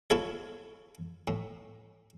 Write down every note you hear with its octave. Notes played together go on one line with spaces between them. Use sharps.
E4 F4 A4 C#5
A2